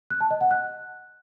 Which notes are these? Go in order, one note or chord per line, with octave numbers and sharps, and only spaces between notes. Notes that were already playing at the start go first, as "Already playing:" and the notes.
F#6
A5
D#5
F#5
F#6